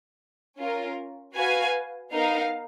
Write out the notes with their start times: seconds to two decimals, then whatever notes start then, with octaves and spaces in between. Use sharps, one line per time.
0.59 C#4 F4 A#4
1.35 F#4 B4 F5 G#5
2.12 B3 D#4 A#4 F5